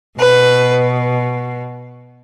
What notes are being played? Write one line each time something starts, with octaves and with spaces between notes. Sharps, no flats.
B2 B4